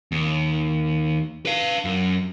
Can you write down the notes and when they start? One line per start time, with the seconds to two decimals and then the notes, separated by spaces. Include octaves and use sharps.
0.12 D#2
1.46 B4 F5
1.85 F#2